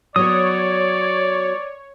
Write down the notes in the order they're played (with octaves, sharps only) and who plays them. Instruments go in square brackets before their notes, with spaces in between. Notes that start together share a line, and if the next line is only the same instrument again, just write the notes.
[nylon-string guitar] F#3 B3 [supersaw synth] C#5 [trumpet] D5 [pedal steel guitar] D#6